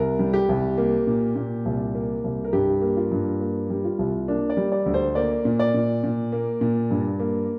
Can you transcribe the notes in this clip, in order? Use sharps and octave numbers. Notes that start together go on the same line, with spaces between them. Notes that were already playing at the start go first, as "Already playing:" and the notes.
Already playing: C2 A#4
G3
G4
C2
A#3
A#2
A#2
C2
A#3
C2
A#4
G2 G4
A#3
F4
G2
A#3
G3
F4
C2
A#3 D4
D5
G3
D5
D2
C5
A#3 D5
A#2
D5
A#2
A#2
A#3
A#2
G2
A#3